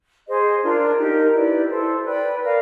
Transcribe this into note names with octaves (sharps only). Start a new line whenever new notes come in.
G#4 C5 D#5
D4 F4 A#4 D5
D#4 G4 A#4 D#5
E4 G4 B4 D5
E4 A4 C5
B4 D5 G5 B5
A#4 D5 F5